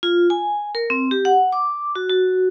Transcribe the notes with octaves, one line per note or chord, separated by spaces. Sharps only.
F4
G#5
A#4
C4
G4
F#5
D6
F#4
F#4